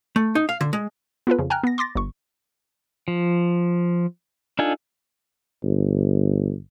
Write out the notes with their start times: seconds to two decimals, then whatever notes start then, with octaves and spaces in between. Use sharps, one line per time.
0.16 A3
0.35 D#4
0.49 F5
0.61 D3
0.73 G#3
1.27 B3 F4 A4 B4
1.38 F2 C#3
1.50 G5 G#5 A#5 F6 F#6
1.63 B3 A#6
1.78 C6 D6 A6 A#6
1.96 G1 C#6
3.08 F3
4.59 D4 D#4 F4 A4 G#5
5.63 G1